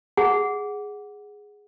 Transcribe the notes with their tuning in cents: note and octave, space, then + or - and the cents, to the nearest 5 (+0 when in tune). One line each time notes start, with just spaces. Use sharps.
G#4 -5 F#5 +0